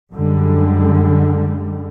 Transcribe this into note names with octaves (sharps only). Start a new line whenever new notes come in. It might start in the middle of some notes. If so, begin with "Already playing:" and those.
F#2 D3 G3 G#3